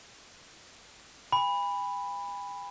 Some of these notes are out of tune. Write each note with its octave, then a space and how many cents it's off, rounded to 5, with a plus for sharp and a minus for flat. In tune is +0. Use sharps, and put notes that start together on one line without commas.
G#5 -45 B5 +0